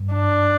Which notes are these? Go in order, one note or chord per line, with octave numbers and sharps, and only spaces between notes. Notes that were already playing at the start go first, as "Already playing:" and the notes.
Already playing: G2
D4